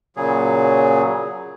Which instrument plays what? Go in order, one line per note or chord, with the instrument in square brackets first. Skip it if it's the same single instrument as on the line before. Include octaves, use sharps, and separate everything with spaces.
[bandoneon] A#2 C#3 F#3 G#4